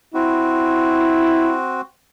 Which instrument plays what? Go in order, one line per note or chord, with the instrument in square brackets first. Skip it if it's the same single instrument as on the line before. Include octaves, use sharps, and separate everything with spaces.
[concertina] C4 F#4 [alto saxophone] E4